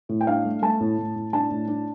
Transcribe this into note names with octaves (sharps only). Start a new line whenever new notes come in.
A2
G5
D4 F5
A3
A3 A5
A2
A2
A2
D4 A5
A2
D4